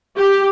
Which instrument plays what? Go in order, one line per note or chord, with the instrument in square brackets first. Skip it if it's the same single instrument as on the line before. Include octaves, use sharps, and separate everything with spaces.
[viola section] G4